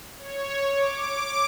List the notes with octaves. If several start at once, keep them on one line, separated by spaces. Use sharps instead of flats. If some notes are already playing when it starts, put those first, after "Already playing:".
C#5
D6